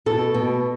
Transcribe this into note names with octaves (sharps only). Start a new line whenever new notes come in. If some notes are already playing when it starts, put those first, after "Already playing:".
B2 A4
B2